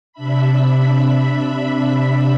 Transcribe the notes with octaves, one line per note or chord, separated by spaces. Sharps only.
C3 D4 E5 B5